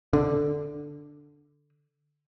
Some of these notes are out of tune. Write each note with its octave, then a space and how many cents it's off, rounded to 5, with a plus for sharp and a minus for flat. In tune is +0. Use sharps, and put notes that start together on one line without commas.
D3 +0